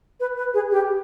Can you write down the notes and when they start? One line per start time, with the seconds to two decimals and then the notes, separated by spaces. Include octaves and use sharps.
0.20 B4
0.37 B4
0.54 G#4
0.71 G4